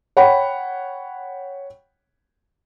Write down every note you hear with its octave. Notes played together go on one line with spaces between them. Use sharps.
C#5 F#5 G5 B5